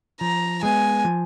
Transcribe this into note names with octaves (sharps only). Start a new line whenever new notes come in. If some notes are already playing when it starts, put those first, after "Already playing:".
F3 A#5
G#3 B3 G#5
F3